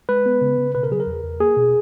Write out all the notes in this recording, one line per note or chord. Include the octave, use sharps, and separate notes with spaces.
G#3 B4
B3
C#3
C#3
B2 B4
A#4
F#3 G#4
A#4
E2
E2
A#3 G#4
B2